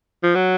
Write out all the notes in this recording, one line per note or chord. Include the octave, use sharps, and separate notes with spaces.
F3
F#3